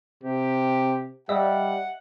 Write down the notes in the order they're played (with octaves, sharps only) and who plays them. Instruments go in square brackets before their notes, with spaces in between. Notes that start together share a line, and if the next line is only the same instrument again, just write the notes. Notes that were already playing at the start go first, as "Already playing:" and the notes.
[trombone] C3 [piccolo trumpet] G4
[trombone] G3 [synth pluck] D#5 E5 [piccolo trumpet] F#5